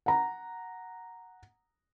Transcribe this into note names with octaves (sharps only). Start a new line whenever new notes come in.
F#5 A#5